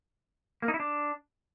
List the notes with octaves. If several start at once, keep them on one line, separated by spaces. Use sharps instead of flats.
A#3
D#4
E4
D4